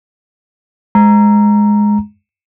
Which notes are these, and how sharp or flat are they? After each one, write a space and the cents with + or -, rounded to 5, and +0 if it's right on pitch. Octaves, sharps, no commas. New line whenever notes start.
G#3 +5 A#5 +0